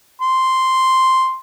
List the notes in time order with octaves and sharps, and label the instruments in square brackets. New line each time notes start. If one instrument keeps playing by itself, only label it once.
[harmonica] C6